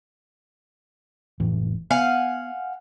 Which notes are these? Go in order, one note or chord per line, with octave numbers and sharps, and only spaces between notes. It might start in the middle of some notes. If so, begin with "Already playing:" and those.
F1 A2 E3
B3 F5 F#5 G#5